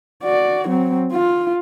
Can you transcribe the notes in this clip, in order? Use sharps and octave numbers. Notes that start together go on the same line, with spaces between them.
F#4 D5
F#3 C4
F4